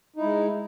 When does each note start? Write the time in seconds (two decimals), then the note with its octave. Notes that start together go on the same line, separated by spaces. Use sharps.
0.16 D#4
0.19 E4
0.22 G#3